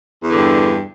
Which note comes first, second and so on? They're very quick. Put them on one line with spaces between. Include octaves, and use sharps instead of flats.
E2 E3 D3 G2